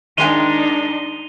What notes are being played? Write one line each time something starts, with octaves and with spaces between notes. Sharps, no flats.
D#3 G#3 D4 D#4 G5 D#7 F7 G7